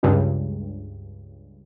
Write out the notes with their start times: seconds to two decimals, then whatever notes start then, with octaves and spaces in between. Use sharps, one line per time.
0.03 C#2 G2